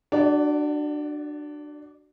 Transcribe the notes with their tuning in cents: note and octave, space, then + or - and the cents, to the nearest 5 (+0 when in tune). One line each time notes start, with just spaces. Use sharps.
D4 +20 F#4 +15 D5 -20